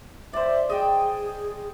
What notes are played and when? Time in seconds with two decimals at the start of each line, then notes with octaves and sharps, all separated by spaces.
0.33 C5 D5 E5
0.69 G#4 D#5 G5